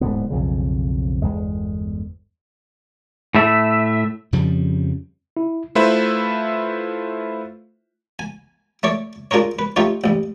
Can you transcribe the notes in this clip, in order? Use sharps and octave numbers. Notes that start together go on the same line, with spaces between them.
D1 G#2 D3 B3
B1 F2 C#3
G1 E2 G#3
A2 A3 E5
F2 C#3 F3 G3
E4
A3 E4 F4 B4 C5 E5
G#5
A3 C#5 D5
D4 F4 G#4 A#4 C#5
B4
A3 D#4 F4 G4 C#5
A1 G2